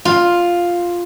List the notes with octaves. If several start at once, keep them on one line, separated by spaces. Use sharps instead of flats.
F4